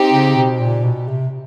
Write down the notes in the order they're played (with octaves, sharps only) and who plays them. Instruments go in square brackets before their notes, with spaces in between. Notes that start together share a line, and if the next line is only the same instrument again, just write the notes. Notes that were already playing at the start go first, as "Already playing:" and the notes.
Already playing: [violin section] C4 D#4 G4
[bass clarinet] C#3
B2
A#2
B2
C3